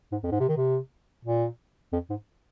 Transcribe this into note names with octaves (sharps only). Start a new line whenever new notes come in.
G#2
F2
G#2
C3
D#3
C3
A#2
F2
G#2